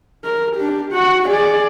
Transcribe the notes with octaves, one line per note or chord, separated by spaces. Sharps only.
A#4
D4 G4
F#4 F#5
G#4 D5